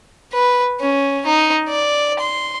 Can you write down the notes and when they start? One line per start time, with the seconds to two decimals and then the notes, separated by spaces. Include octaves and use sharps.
0.34 B4
0.81 C#4
1.26 D#4
1.69 D5
2.20 C6